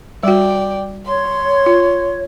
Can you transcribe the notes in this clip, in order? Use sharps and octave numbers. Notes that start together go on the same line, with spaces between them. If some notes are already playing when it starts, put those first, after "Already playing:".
G3 F#4 D5 G5
C#5 C6
F4